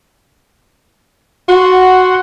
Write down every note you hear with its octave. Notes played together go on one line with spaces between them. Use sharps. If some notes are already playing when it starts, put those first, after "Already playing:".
F#4 F#5 C6